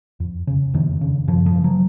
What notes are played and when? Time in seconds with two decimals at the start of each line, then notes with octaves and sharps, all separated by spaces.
0.20 F2
0.47 C#3
0.74 F2 D#3
1.01 C#3
1.28 F#2 F3
1.46 F3
1.56 C#3
1.64 F#3